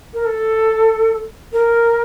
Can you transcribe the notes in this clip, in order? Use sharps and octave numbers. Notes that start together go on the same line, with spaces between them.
A#4
A4
A#4